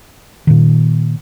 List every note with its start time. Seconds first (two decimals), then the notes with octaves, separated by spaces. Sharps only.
0.47 A#2 D#3